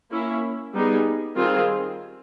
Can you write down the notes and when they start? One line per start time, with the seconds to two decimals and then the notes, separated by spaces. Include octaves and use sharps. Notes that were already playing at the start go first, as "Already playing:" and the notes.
0.11 A#3 C#4 E4
0.73 G3 B3 D#4 G#4
1.35 D#3 G3 C4 F4 G#4